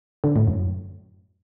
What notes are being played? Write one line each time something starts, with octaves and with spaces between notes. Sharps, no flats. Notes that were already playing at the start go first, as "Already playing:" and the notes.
D3
A2
F#2